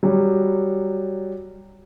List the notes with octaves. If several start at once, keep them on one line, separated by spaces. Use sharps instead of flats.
F#3 G3